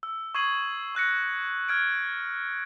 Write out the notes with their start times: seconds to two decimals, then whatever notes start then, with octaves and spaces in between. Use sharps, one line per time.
0.03 E6
0.35 C#6 D#6 G#6 C7 D#7 F#7
0.95 C#6 F#6 A#6 C#7
1.69 F6 G#6 D7